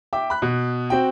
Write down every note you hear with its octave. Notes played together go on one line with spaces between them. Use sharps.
E5 G5 D6
B5 F#6
B2
C4 F#4 G5